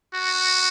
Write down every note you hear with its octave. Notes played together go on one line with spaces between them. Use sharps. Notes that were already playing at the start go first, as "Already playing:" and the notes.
F#4